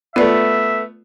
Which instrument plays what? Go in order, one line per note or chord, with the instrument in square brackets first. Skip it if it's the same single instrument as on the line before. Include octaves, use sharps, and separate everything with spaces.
[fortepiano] A3 B3 [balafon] F4 D5 [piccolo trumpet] E5